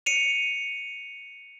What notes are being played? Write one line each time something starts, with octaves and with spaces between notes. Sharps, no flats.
C#7 D#7 F7